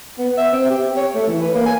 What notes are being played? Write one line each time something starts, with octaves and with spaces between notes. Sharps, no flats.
B3
E5
C4
G4
C#5
A3
E3
B4
A#3
G#5